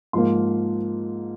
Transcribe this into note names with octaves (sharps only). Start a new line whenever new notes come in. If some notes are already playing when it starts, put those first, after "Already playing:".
G#2 F3 A#3 C6